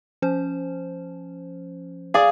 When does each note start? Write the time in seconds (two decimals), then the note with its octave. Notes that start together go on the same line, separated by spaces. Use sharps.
0.22 F3 C#4 C5
2.14 G#4 D5 F5